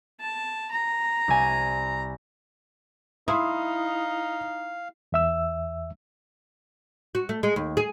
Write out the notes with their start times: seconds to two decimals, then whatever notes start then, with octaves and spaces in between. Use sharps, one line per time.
0.20 A5
0.71 A#5
1.28 C2 G#5
3.28 D#4 E4 F5 C6 D#6
5.12 E2 E5 E6
7.15 F#4
7.29 A3
7.43 G#3
7.56 D#2
7.77 G#4